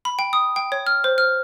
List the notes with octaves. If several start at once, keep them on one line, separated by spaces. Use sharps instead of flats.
B5
G5
D#6
G5
C#5
F6
C5
F6